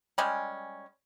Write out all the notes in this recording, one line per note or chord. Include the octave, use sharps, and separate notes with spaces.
G3 G#3 C#4